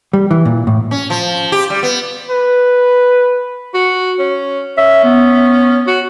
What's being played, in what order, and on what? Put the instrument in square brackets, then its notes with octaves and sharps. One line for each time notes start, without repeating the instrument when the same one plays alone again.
[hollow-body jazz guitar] G3
E3
A#2
A2
[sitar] C#4
F3
G4
G3
B3
[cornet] B4
[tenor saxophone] F#4
C#4
[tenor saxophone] C#4 [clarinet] E5
[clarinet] B3
[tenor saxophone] F#4